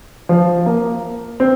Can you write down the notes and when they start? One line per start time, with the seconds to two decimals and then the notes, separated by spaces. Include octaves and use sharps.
0.29 F3
0.66 A#3
1.40 C4